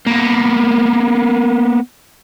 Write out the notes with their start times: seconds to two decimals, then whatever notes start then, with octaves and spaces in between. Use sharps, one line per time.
0.07 A#3 B3